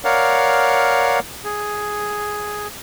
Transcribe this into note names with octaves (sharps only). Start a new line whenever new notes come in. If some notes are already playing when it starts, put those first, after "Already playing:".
A#4 C#5 D5 F5 F#5
G#4